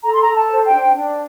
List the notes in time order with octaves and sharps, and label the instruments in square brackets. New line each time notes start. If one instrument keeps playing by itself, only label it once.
[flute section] A4 A#5
C6
A#5
A4
A5
C5
G5
D4
D4